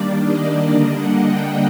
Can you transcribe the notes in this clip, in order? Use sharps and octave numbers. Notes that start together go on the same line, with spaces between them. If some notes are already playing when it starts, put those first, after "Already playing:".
Already playing: D#3 G3 A#3 D4 D5
D#5
D3 G3 A#3 D4 D#5
F#5
G5